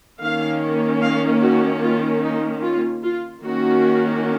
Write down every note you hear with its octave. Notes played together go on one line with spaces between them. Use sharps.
D#3 A#3 C#4 F5
F5
F#4
F4
D#4
F4
F4
D#3 A#3 C#4 F#4